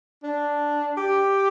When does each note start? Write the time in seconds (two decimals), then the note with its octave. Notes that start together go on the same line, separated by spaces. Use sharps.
0.23 D4
0.97 G4